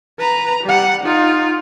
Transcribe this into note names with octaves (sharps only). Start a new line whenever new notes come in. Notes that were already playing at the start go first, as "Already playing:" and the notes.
B4 A#5
G3 F#5
D#4 F4